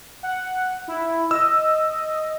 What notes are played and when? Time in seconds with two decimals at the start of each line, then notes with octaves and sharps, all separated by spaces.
0.23 F#5
0.88 E4
1.31 D#5 E6